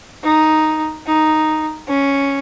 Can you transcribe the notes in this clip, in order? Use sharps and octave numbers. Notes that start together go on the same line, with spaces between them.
D#4
D#4
C#4